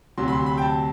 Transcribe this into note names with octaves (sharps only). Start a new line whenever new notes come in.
D2 C3 F#3 C6
B5
C6
B5
G5
A5